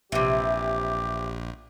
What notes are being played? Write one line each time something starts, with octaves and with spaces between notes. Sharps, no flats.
A#1 C3 E3 G4